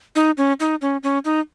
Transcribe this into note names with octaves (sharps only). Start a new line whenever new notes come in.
D#4
C#4
D#4
C#4
C#4
D#4